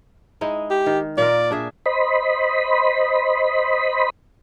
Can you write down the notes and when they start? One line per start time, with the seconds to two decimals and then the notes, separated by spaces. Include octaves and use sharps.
0.41 G#3 D#4 E4
0.70 G4
0.86 D#3
1.18 A#2 F4 A#4 D5
1.51 D4 G#4 E5
1.86 C5 D#5 B5